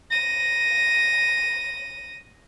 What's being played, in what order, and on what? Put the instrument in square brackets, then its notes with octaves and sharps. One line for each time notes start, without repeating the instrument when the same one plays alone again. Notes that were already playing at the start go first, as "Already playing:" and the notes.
[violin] A#6 D#7